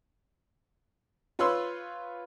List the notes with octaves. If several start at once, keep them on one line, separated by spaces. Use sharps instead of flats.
F4 B4 C#5 B5 C6 E6